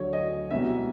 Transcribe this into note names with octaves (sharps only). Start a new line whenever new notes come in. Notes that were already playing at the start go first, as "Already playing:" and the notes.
Already playing: D2 D3 F#3 A3 C#5
D#5
C2 B2 F#3 B3 E5